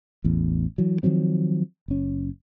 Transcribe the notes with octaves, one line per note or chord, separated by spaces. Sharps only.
A1 E2
E3 F#3
D#3 F3 F#3 C4
F#1 C#4